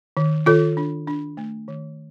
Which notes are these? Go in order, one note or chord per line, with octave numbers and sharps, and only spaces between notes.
D#3
D#3 F4 A4
D4
D4
A3
D#3